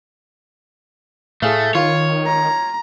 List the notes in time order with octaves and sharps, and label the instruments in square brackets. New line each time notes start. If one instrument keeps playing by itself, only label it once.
[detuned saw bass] A2 [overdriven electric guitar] A3 [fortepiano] G#4 A4 F5
[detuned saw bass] D#3 [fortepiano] F4 F5 [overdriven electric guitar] C#5
[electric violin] A#5